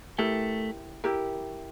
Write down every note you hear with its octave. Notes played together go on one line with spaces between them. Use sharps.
A3 E4 G4 A#4
E4 G4 A#4